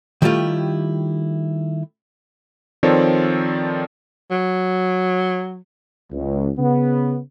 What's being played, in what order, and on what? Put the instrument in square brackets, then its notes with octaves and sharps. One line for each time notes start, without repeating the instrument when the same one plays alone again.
[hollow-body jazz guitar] D#3 G3 A3 E4 F4 G4
[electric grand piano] D#3 F3 C4 A4 C#5 D5
[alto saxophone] F#3
[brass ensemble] C#2
C#3 B3